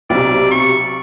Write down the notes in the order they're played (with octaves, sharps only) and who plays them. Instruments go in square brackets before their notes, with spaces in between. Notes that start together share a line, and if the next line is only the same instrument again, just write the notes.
[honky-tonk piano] B1 C3 [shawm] D5
[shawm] C#6